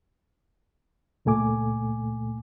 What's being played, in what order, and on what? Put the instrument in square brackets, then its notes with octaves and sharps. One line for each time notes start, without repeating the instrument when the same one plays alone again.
[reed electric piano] C#2 A#2 A3 G#5 D6